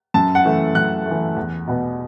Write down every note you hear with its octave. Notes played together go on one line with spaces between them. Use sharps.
F#2 A5
F#5
E3 A3
F#2 F#6
A3
E3
E2
B2 B3